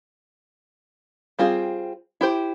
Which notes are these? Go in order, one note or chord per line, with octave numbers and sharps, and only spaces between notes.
G3 C4 F4 G#4
E4 G4 C5